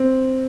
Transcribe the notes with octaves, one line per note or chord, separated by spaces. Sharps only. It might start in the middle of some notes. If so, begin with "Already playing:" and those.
Already playing: C4